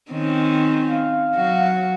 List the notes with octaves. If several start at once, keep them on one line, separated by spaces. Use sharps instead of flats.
D#3 C4 C#4
F5
F#3 F#4